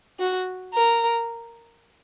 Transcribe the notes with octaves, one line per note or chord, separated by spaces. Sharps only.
F#4
A#4